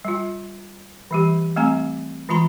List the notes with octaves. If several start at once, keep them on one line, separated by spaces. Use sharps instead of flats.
G3 F4
E3 G3 G4
G3 A3 C4 G#5 A#5
E3 G#3 F4 A#5 C6